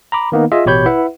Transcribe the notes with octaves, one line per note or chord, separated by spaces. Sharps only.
A#5 B5 D6
D#3 A#3 B3 D#4
F4 G#4 D#5 E5
A1 B2 G4 C#5 B5 G6
E4 B4 E5 F#5